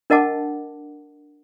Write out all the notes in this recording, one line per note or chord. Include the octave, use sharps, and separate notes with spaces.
D4 A#4 D#5 F#5 A5 D6